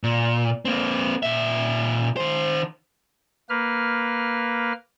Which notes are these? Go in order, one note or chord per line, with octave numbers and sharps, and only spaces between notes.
A#2
A#3 C4
A#2 E5
D#3 C5
A#3 B4 F6